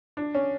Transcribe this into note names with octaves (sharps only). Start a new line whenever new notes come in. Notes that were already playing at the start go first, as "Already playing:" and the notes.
D4
C#4